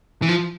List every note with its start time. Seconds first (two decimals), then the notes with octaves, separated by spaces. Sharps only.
0.22 E3
0.29 F3